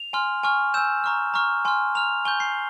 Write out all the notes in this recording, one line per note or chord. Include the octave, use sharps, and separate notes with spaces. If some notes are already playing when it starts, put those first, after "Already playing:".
Already playing: F7
G#5 C6 F6
G#5 C#6 F6
G#5 E6 G6 E7
A#5 C#6 F6
A#5 C#6 F6
G#5 C6 F6
A#5 F6 F7
G#5 C#6 G6 G7
C7